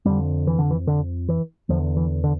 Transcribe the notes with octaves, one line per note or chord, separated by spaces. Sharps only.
F2 D3 G3
E3
D3
E3
D3
E3
E2 D3 F3
E3
D3